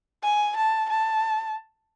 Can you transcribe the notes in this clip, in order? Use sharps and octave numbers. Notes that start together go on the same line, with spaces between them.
G#5
A5
A5